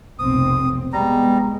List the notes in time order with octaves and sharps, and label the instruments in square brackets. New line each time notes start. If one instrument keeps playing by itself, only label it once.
[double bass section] F1 B1 C4 [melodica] D#6
[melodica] G3 A#5 [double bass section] G#3 B3